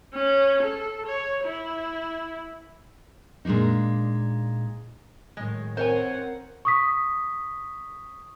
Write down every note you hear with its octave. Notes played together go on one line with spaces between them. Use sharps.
C#4
A4
C#5
E4
A#2 G#3 A#3 D4 D#4
F#2 A2 D#3 G#3
C4 A#4 C5 C#5 F#5 G#5
C#6 D#6 B6